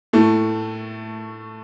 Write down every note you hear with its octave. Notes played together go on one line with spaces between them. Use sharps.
A2 A3